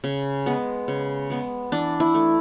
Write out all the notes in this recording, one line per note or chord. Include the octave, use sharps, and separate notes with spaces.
C#3
G#3 B3
C#3
G#3 B3
E3 D4
E4
A3